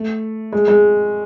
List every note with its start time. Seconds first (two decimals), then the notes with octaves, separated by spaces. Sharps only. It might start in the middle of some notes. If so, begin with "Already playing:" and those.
Already playing: A3
0.52 G#3
0.68 G#3